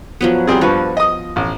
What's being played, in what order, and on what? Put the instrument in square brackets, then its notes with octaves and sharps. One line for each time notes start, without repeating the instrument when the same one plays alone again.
[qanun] F3 F#3 B3
[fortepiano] G3 C4 G#4
[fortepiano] G2 B4 C#6 [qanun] F3
[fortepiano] D#5 D#6
A1